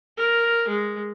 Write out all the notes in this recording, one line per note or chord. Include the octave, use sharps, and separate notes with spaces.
A#4
G#3